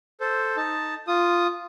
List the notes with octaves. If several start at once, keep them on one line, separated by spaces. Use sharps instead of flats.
A4 C5
D#4 A5
F4 D#6